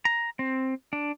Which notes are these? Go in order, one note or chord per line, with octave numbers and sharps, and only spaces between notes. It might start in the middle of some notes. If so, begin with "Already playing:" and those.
A#5
C4
D4